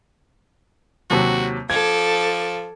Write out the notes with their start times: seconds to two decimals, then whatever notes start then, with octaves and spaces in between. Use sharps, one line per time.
1.10 D#2 C3 F#3 F#4
1.70 F3 A4 D6 G#6